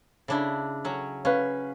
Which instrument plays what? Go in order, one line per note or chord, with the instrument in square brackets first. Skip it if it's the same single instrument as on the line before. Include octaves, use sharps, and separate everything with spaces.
[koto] C#3 D4 E4
F#3 C#4
[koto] C#4 [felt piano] B4 F5